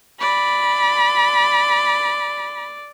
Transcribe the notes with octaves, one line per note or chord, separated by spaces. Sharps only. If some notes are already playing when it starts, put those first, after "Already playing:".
D5 B5